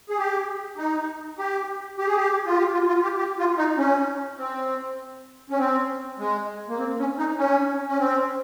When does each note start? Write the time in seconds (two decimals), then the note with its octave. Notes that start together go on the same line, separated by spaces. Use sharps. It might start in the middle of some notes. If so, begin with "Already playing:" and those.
0.09 G#4
0.18 G4
0.78 D#4
1.38 G4
1.98 G4
2.07 G#4
2.16 G4
2.46 F4
2.58 G4
2.73 F4
2.88 F4
3.03 G4
3.18 G4
3.39 F4
3.58 D#4
3.78 C#4
4.38 C4
5.50 C#4
5.58 C4
6.19 G#3
6.69 A#3
6.79 C4
6.99 C#4
7.18 D#4
7.38 C#4
7.88 C#4
7.99 C4